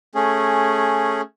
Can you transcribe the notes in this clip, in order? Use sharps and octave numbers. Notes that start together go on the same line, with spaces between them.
A3 C#4 G#4